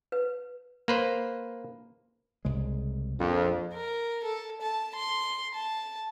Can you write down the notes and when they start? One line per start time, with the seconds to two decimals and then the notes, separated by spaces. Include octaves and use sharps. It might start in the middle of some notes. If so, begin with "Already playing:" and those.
0.12 B4
0.88 A#3 B4 C5
2.45 C2 C#3 G#3
3.19 A#1 F2
3.74 A#4
4.23 A4
4.61 A5
4.95 C6
5.55 A5